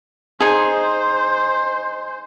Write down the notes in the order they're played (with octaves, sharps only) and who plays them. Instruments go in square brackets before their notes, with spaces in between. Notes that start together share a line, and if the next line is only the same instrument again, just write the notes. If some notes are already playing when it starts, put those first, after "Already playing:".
[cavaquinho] D#4 G#4 [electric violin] C5